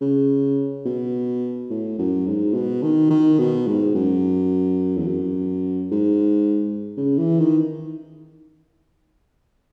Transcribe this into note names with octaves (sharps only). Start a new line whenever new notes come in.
C#3
B2
A2
F#2
G#2
B2
D#3
D#3
B2
G#2
F#2
E2
F#2
G#2
C#3
E3
D#3